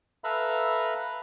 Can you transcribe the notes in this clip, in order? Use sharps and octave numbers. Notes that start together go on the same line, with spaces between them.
A4 B4 E5 F5 A#5 B5